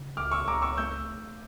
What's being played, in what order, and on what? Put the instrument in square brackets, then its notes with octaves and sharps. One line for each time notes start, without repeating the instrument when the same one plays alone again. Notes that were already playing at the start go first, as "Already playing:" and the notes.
Already playing: [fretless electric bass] C#3
[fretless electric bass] C#2 [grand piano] D6 F6
[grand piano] C#6 E6
[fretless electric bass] C#2 [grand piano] A#5 D6
[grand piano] C#6 E6
[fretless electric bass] A3 [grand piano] E6 G6